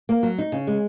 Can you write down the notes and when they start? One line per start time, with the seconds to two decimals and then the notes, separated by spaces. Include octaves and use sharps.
0.09 A#3
0.23 F#3
0.38 D#4
0.52 C#3
0.67 G#3